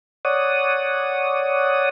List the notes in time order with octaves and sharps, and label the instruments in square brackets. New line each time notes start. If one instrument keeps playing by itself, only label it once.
[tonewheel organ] C#5 D5 F#5 D#6